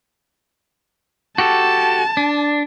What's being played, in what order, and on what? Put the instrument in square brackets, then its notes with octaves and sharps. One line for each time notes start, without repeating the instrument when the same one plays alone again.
[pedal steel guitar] F#4 G4 A4 [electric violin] A5
[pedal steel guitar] D4